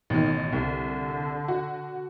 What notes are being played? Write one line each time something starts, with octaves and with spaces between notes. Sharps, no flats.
A1 B2 D#3
C2 D3
F#4